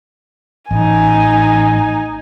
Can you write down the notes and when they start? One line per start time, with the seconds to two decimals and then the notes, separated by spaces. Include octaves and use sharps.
0.71 A1 D#4 G#5